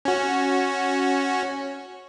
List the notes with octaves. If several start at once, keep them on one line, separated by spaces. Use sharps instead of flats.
C#4 F#4